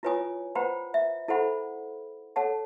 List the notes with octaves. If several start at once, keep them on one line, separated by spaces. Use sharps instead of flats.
E4 F4 B4 C#5 G#5 D#6
B4 C5 F#5 G5 A#5 B5
E5
E4 A4 C5 F#5 B5
A4 C#5 F#5 A5